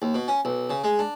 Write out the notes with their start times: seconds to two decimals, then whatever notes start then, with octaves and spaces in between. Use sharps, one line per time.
0.02 D#2
0.14 B2
0.28 C#4
0.45 B1
0.70 C#3
0.84 G#3
0.99 D4